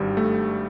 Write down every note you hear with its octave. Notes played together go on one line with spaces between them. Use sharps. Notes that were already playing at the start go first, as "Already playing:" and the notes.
Already playing: G#1 G2 G3
A3